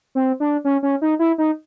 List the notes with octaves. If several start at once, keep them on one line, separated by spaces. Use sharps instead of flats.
C4
D4
C#4
C#4
D#4
E4
D#4